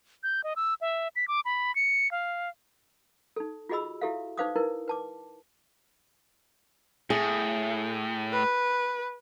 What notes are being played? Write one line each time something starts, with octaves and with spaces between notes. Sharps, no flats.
G6
D#5
E6
E5
B6
D6
B5
C#7
F5
D#4 A4
F4 F#4 G#4 D#5 B5 E6
E4 F#4 G4 A4 E5 F5
D#4 B4 C5 F5 D6 D#6
D#4 E4 A#4 B4
B4 A5 D6
A2 G#4
B4